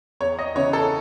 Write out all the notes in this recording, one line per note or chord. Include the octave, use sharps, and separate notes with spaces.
E2 C#5
D#5
C#3 E3 B3 C#5
A4